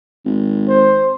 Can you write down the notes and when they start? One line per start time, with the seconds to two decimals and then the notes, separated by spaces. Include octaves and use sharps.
0.25 G#1
0.69 C5